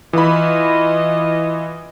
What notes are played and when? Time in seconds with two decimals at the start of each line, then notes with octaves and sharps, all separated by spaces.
0.13 E3 F4 D#5 B5